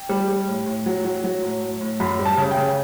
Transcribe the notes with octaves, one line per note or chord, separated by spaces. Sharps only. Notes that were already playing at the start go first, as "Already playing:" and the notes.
Already playing: G5
G3
G3
A2
A2
F#3
F#3
F#3
A2
A2
A2
F#2 B5
G3
A5
C#3
G5
C#3